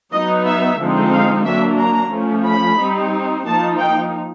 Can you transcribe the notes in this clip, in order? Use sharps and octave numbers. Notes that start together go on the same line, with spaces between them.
F#3 B3 D#4 D#5
E5
D3 F3 G#3 C4 D#4
F5
F#3 A#3 D4 E5
A#5
F3 A3 C#4
B5
G3 C4 D#4
F3 A#3 D#4 A5
G5